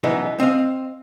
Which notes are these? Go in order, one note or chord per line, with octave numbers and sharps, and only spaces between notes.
F#2 B2 E3 G#3 B3 D#4
C4 D#5 F5